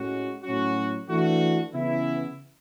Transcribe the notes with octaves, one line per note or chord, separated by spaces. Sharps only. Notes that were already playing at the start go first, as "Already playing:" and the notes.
Already playing: A2 G#3 C#4 F#4
A2 F#3 C#4 F#4
E3 A3 D4 F#4
C#3 E3 B3 E4